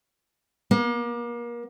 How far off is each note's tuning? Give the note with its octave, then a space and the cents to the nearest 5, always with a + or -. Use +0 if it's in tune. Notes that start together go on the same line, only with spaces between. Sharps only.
A#3 +35